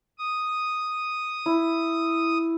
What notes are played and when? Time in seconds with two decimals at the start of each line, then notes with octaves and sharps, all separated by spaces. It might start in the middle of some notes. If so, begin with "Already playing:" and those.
0.19 D#6
1.46 E4